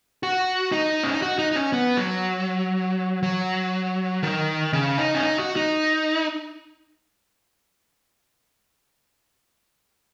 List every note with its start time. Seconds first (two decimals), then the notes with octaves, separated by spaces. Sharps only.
0.23 F#4
0.72 D#4
1.04 C#4
1.13 D#4
1.22 F#4
1.39 D#4
1.51 D#4
1.56 C#4
1.73 B3
1.97 F#3
3.23 F#3
4.23 D#3
4.73 C#3
4.98 D#4
5.15 C#4
5.23 D#4
5.39 F#4
5.56 D#4